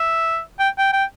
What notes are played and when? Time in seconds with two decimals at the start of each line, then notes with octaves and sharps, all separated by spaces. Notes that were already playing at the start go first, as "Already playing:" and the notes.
Already playing: E5
0.59 G5
0.78 G5
0.93 G5